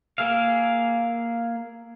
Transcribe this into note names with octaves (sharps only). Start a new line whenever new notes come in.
A#3 G#4 E5 F5